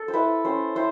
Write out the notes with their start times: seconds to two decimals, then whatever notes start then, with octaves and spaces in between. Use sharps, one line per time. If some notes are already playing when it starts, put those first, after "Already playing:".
Already playing: A4
0.08 C5
0.13 E4 B4
0.45 C#4 C5
0.75 E4 C5